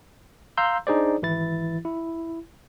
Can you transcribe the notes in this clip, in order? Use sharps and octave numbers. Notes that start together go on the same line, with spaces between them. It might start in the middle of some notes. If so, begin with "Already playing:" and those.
F5 A#5 C6 E6 G6
D4 D#4 G#4 C5 D5
G#1 E3 E4 A6
E4